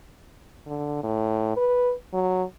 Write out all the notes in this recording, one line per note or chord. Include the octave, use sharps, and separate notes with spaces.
D3
A2
B4
F#3